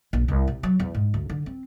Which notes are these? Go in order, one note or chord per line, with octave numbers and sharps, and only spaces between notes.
A#1
C2
C3
F#3
E2
G#2
D2
D3
C4